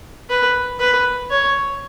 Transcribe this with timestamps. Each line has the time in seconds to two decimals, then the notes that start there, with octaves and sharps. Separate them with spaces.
0.30 B4
0.80 B4
1.30 C#5